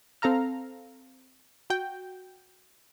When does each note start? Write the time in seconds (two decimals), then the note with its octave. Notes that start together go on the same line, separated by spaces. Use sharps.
0.22 C4 A4 F5 A#5 F6
1.70 F#4 G5